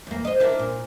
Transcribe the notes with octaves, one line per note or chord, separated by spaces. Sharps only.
E2 A#3
C5 D#5
D4 E4 A#4
A#2